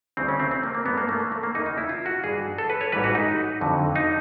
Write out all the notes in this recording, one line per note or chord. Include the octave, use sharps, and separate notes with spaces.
D2 C#3 E3 G3 C4
C#4
C4
C4
A#3
A#3
G2 E3 G#3 B3
A#3
A3
A#3
A3
A#3
E2 C#3 E3 D#4
D#4
E4
F4
F#4
G2 E3 G3 G#4
A4
B4
C#5
A1 G#2 E3 G3 B4
F#4
D#4
F2 D3 F#3
D#4